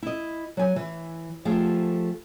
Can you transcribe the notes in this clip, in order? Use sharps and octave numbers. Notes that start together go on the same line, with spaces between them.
E4 D#5
F#3 G#5
E3
F3 A3 G4 G#4